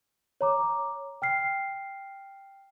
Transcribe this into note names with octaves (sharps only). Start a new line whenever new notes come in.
C#5 A#5 D6
G5 F6 C7